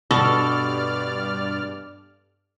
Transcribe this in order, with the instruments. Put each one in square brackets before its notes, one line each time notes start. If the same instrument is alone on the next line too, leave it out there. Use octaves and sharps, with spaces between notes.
[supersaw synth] G2 D5 F6 [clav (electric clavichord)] B2 [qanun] A4